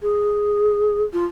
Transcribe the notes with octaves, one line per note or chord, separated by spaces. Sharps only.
G#4
F4